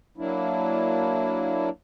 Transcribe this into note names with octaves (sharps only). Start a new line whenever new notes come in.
F#3 A#3 D4 E4